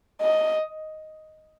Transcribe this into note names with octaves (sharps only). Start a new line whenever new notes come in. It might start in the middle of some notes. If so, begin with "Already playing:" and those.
D#5